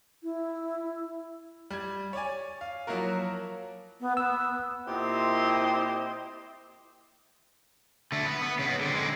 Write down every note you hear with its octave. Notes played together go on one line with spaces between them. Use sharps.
E4
G3 G#6
C#5 D5 G#5
F5
F3 F#3 A#3 E4 F#4 A#4
B3
B3 E6
A#2 C4 E4 G4 C5 D#5
D3 A3
B3
B3
C#3 B3
D3 C4
D3 G#3